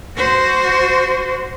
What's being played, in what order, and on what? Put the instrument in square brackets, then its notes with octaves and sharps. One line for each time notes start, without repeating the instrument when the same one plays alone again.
[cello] F#4 C5